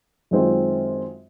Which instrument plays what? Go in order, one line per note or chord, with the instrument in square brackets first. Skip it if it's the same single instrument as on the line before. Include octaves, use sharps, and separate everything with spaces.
[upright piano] F#2 D#3 G#3 C4 F4